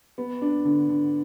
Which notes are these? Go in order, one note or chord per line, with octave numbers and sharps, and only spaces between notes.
B3
D4
D3
D3